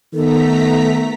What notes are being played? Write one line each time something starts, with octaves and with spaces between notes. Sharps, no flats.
D#3 A3 B3 A4 A#5 B6